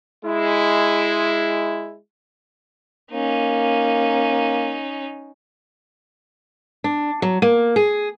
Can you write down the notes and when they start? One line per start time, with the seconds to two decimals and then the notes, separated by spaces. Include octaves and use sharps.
0.25 G#3 E4
3.12 A#3 C#4 D#4
6.84 D4
7.22 F#3
7.42 A#3
7.76 G#4